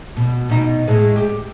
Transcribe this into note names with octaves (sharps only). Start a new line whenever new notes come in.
B2
B2 D#4
A2 G#3 G#4
G4